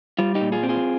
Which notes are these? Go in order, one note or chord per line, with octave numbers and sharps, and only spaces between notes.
G3 F4
D#4 G4
A#2
F4 G#4
C4
F4 G#4